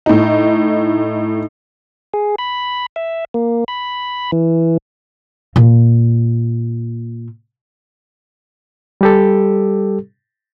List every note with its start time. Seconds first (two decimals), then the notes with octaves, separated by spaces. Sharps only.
0.06 A2 D#4
2.14 G#4
2.38 B5
2.96 E5
3.34 A#3
3.68 B5
4.32 E3
5.56 A#2 A#3
9.01 G3 G4 A4